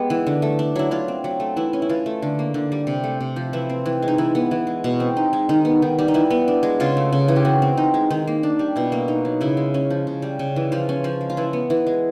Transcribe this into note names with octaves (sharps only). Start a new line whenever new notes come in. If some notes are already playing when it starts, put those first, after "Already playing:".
Already playing: G#3 B3 G4
E3
D3
A3
D4
F#3 E4
F#3 F4
C4
F#3
A3
E3 E4
C#4
E4
E3 F4
A3
D3
A#3
D3
G3
C3
A3
C3
F3
E3 E4
C4
E3
G#3
D#4
E3 E4
B3
E3
G#3
B2
C4
D#4
G#3
D#3 D#4
B3
D#3
G3
D#4
E3 E4
B3
D4
G#3
C#3 F4
A3
C#3
E3
G4
E3 F#4
C4
D#4
G#3
D#3 D#4
A#3
D4
G3
B2 E4
A#3
D#4
F#3
C#3 E4
G#3
C#4
F3
C#3
G3
C#3
E3
F3 F4
C#4
F3
G#3
F4
E3 E4
B3
E3
G#3